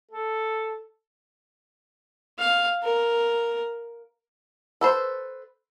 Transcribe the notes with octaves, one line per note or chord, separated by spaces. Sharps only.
A4
F5
A#4
A4 B4 C5